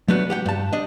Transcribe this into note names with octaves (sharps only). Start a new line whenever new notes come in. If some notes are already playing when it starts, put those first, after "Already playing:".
F#3 A3 B3 D4 F#4
G4 F#5 G5
G2 A5
D4 D#5